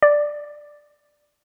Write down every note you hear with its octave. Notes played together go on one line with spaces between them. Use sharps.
D5